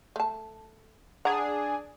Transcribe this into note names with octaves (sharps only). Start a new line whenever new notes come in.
A3 A5
D4 G#4 F#5 A#5